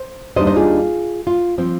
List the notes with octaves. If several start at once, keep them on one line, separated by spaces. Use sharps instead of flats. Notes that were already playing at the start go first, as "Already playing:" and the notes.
Already playing: C5
D#2 D#3 G3 D4 C5 D#5
C5 D#5
F4 G#4
F4
F3 C4